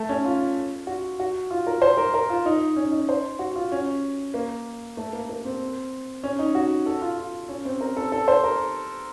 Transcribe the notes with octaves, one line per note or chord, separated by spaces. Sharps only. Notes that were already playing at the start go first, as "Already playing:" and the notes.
Already playing: A3
C#4
F4
F#4
F#4
F4
A#4
C5
A#4
A#4
F4
D#4
C#4
D#4
C5
F#4
F4
C#4
A#3
A3
A#3
A#3
C4
C#4
D#4
F#4
A4
F4
F4
C#4
C4
A#4
A4
A4
C5
A#4